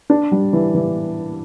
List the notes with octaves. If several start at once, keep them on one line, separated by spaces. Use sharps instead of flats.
D4
G3
E3
E3